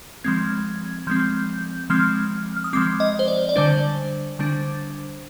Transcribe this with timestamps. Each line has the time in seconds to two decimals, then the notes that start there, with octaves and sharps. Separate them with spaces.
0.24 F3 G#3 C4 G#6
1.07 F3 G#3 C4 G6
1.90 F3 G#3 C4 F6
2.57 F6
2.64 D#6
2.73 F3 G#3 C4 D6
3.00 D#5
3.19 C5
3.28 D5
3.49 D5
3.56 D3 G3 D4 C5
4.39 D3 G3 D4